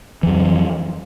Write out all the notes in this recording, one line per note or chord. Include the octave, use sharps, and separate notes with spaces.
F2 E3 F#3